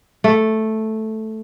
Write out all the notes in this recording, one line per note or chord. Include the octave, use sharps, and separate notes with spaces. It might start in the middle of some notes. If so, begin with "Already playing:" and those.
A3